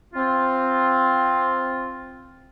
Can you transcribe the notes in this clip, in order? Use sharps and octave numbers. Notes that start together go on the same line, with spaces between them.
C4 F4